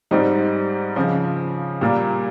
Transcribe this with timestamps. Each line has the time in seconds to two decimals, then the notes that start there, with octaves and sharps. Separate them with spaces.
0.11 G#2 G3 C4 D#4
0.96 C#3 F3 C4
1.81 A#2 G3 A#3